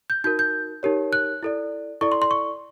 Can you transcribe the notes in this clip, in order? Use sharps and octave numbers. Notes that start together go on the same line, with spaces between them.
G6
D#4 F#4 A#4 G6
G6
D#4 G4 A#4 C#5
F#6
E4 A4 D5
E4 A4 D5 C#6
C6
C6
C#6